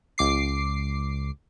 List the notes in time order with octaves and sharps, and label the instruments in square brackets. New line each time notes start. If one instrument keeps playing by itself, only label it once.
[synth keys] C#2 D6 C7